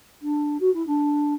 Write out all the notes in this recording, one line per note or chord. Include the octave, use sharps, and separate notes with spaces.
D4
F#4
E4
D4